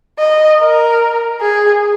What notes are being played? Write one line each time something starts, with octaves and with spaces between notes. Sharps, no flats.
D#5
A#4
G#4